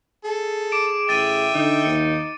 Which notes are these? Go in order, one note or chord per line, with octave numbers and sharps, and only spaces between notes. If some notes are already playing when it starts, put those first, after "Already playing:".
G#4 A4
D6 D7 E7
A1 E5 G5 A6 D#7
D3 D#4
D#2 C#7